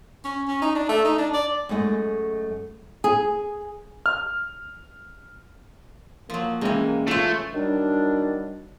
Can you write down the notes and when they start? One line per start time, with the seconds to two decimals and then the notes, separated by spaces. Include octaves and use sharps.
0.24 C#4
0.48 C#4
0.62 D#4
0.75 D4
0.89 A3
1.05 D#4
1.18 D4
1.34 D5
1.69 F#2 G#3 A3 D#5
3.04 G#4
4.06 F6
6.30 F3 F#3 A#3
6.61 C3 E3 G#3 C#4
7.08 A3 C#4 F4 A4
7.53 D#3 F#3 G3 D4